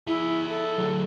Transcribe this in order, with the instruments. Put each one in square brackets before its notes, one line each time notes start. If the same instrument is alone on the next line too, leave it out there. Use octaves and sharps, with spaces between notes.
[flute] E4 [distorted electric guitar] G#4 E5
[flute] A4
[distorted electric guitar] D3 F#3